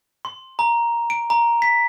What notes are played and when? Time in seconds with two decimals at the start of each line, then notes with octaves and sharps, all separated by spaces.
0.25 C6
0.59 A#5
1.10 D7
1.30 A#5
1.62 B6